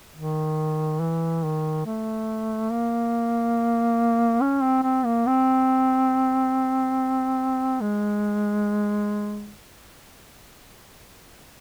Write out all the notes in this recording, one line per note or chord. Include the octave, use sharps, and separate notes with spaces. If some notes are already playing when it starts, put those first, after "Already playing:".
D#3
E3
D#3
A3
A#3
C#4
C4
C4
A#3
C4
G#3